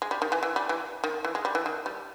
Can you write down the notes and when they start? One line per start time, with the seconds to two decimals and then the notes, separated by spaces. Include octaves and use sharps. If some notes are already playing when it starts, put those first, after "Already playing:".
0.02 G#3
0.11 G3
0.22 D#3
0.32 E3
0.43 E3
0.56 G3
0.69 E3
1.04 D#3
1.25 E3
1.35 G#3
1.45 G3
1.55 E3
1.66 D#3
1.86 G3